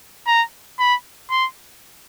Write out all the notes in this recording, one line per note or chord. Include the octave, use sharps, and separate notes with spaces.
A#5
B5
C6